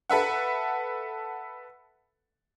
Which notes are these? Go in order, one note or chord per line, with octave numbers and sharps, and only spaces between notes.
A4 B4 E5 F#5